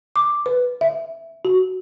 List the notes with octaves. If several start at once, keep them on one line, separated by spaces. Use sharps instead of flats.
D6
B4
E5
F#4